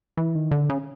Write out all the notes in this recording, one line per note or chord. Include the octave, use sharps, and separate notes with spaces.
E3
D#3
D3
C#3